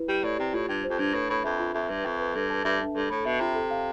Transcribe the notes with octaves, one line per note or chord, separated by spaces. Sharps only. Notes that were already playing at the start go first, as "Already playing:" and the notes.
Already playing: E4 B4
G3 G4
A2 D5
C3 G4
A2 F4
G2 G5
C5
F2
G2 D4
A2 B4
A2 B5
F2 E5
F4
F2 E5
G2 B4
F2 G5
B4
G2 A4
A5
G2 E5
D4
G2 A4
A2 B5
B2 E5
C3 F4
A4
F5